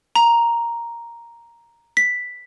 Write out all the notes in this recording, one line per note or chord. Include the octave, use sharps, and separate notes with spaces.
A#5
B6